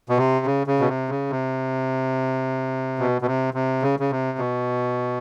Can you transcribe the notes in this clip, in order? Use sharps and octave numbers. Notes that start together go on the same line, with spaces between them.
B2
C3
C#3
C#3
B2
C3
C#3
C3
B2
B2
C3
C3
C#3
C#3
C3
B2